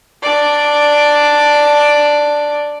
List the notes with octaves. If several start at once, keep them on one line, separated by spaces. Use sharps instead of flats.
D4 D5